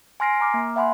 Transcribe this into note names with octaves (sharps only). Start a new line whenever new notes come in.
G#5 C6 F6 A#6 C7 D7
A#5 D6 F6
A#3
E5 F#5 G#5 B5 C6